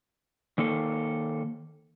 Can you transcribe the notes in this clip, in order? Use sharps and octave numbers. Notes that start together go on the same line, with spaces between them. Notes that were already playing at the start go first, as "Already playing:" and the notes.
D#3 A#3 A4